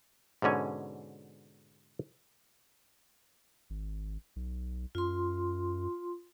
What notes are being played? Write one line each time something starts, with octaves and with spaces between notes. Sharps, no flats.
G#2 B2 D3 C#4 G#5
G#1
B1
F#2 F4 C6